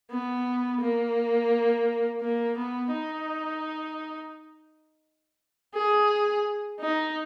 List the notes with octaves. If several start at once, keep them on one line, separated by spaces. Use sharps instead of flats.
B3
A#3
A#3
B3
D#4
G#4
D#4